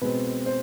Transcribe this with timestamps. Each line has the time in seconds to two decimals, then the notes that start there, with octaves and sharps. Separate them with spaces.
0.01 B2 G#3 C4 B4
0.46 C5